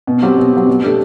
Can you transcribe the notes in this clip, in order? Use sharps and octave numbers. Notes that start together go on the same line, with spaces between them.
B2
F#3 C4 G4
B2
F#3 C4 G4
B2
A3 D4 G4